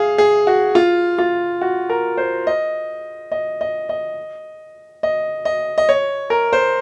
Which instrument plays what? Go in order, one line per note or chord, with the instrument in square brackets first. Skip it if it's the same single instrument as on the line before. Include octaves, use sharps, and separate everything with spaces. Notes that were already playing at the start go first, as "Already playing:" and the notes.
Already playing: [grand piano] G#4 F5
G#4
F#4
F4
F4
F#4
A#4
C5
D#5
D#5
D#5
D#5
D#5
D#5
D#5
C#5
A#4
C5